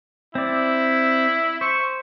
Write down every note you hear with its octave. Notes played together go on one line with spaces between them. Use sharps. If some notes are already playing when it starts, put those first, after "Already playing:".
C4 E4 D5
C5 C#6